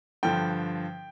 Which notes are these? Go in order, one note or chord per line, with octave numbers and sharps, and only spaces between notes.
G2 D3 F3 G5